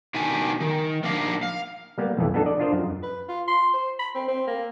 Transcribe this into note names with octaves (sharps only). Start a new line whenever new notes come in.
B2 D#3 D4 D#4 G4 G#5
D#3
F3 A#3 D4 D#4 A#4 F5
F5
G3 A#3 B3
B1 F2 E3
B3 D4 D#4 A4
D5 D#5
D4 F4 A#4 C5 D#5
F#2
B4
F4
C6
C5
B5
C4
C4
A#3